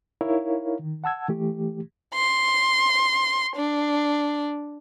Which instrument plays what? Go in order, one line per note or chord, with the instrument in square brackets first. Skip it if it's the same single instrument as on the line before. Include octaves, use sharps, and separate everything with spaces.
[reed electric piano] D#4 E4 A#4 C#5 F5
D#3
F#5 A5 E6 G#6
E3 A3 G4
[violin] C6
D4